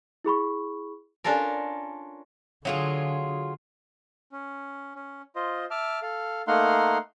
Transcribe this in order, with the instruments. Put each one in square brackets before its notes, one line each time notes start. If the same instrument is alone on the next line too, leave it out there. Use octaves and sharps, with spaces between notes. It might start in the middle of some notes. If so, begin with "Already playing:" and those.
[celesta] E4 G#4 B5 C#6
[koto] C#4 D4 F4 A4 A#4
[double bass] D3 [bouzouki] F#3 F4 G#4
[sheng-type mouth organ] C#4
C#4
F4 C5 D#5
E5 A5 D6 F6
A4 F5
A3 A#3 D#4 F5 F#5 C6